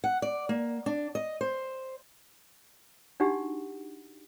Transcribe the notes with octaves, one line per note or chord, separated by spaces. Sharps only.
F#5
D5
A#3
D4
D#5
C5
D4 D#4 F#4 G4 E5 F#5